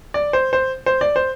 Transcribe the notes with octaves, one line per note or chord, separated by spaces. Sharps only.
D5
C5
C5
C5
D5
C5